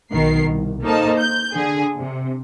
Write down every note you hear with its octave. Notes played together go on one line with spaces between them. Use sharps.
B1 B2 D#3 A#4 C7
C2
A#3 D#4 A4 C5 D#5 A5
G6
D3 G#4
C3